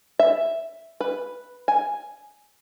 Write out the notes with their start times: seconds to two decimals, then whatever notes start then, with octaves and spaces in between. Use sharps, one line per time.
0.19 E5
1.01 B4
1.68 G#5